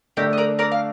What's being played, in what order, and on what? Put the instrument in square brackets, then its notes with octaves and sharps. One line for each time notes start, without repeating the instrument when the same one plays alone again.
[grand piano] D3 A3 D4 A4 [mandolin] G4 A#4
[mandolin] D#5
A#4 D5
A#4 D5
F5